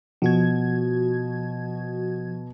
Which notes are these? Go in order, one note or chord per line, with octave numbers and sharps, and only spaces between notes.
B2 F3 F#4 G#6